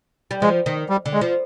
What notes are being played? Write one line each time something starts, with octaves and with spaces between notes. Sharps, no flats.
G3
F3 G#3
D#3
G3
D3
G#3
F3